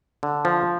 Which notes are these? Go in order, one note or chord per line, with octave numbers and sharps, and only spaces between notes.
D3
F3